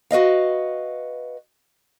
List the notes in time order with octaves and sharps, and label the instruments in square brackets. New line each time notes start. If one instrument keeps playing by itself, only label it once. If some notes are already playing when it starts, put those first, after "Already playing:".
[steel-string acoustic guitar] F#4 B4 D#5 F5